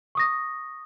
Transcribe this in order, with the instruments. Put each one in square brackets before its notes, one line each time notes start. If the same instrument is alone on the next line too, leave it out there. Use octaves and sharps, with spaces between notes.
[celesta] C#6 D#6 A#6